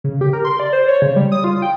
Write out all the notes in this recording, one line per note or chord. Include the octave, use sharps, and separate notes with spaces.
C#3
G4
A#4
C6
D5
C5
C#5
C#3
G3
D#6
F4
G5